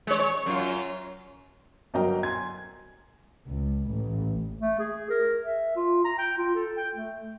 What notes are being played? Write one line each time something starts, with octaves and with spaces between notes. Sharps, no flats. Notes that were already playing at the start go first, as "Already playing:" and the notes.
G#3 C#5
C#5
F#2 F4
G1 F#3 A#4 D#5 G5 A#5
G#5 C6 G#6
C#2
A1
A3
G#4
A#4
E5
F4
A#5
G5
F4
A4
G5
A3